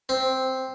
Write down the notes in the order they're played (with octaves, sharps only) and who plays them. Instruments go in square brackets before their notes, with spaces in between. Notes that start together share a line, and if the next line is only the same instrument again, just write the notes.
[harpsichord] C4